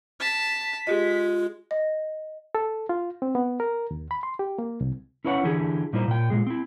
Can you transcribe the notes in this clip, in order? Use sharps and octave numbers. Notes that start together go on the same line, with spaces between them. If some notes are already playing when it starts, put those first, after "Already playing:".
A5 B6
G#3 F4 G4 G#4 D#5
D#5
A4
F4
C4
B3
A#4
D#2
B5
C6
G4
A#3
C2
C#4 E4 B4 C#5 F5 F#5
D3 E3 E4 G4 G#4
A#2 G3 D#4 E4 C5
A#2 G5
A#2 G#3 G#4
C4 E4